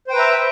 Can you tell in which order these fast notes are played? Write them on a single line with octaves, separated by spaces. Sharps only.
C5 G5 B4 A#5 E5